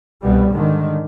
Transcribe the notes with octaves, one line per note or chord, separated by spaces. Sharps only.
C2 B2 G3
G#2 D3 D#3